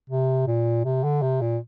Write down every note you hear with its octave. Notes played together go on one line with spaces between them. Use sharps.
C3
A#2
C3
D3
C3
A#2